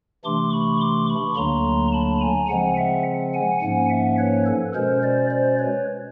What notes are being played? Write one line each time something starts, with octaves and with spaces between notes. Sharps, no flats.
C3 E3 A3 D4 C6 D6
B5 C#6
C6 D6
B5 C#6
D2 D3 F#3 A#3 D4 A#5 C6
A5 B5
G#5 A#5
C#3 F3 G#3 C4 F#5 G#5
E5 F#5
F#5 G#5
G#2 F3 A#3 C#4 F#5 G#5
E5 F#5
B4 C#5
A4 B4
B2 G#3 C#4 A#4 C5
C5 D5
C5 D5
B4 C#5